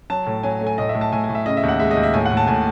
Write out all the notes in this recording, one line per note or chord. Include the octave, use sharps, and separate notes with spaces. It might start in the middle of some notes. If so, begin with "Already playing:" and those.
F#3 A5
A2
F#3 G#5
A3
G#5
A2 D#5
E5
A2
A5
A2 G#5
A2 G#5
E5
C#3 D#5
E5
D#2
F#5
G#3 E5
D#5
D#2
E5
A2 G#5
A2 F#5
A5
A2 G#5